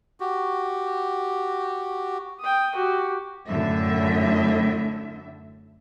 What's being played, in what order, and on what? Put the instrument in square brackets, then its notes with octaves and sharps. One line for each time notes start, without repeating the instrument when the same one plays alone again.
[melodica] F#4 G4
[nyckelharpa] G5 D#6
F#4 G4
[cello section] F#2 A2 D3 E5